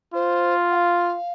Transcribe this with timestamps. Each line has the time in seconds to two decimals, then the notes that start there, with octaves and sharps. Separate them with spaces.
0.13 F4 C5
0.71 F#5
0.76 F5